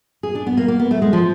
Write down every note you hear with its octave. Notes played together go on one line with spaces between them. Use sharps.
G#4
D4
B3
A#3
A#3
B3
A3
G#3
F3